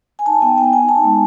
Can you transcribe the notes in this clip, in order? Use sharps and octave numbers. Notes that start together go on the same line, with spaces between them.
G#5
D#4 A5
B3 G5
B3 G5
D#4 G#5
D#4 A5
G#3